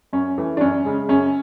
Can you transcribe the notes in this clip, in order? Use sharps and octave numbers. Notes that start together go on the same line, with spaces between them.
F#2 C#4
E3 A3
D4
F#2 C#4
C#3 G#3
F#2 C#4